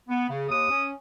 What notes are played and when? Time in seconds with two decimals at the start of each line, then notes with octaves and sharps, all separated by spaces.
0.08 B3
0.29 C#3
0.49 D#2 D#6
0.69 C#4